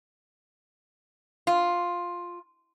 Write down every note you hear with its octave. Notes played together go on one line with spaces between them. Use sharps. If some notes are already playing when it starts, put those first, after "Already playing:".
F4